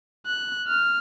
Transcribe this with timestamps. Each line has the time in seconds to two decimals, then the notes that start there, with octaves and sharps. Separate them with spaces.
0.27 F#6
0.68 F6